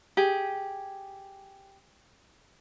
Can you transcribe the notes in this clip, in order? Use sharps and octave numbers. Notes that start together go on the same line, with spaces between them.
G4 G#4